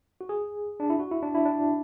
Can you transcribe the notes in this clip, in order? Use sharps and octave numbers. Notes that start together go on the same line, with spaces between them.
F#4
G#4
D4
E4
F#4
E4
D4
E4
D4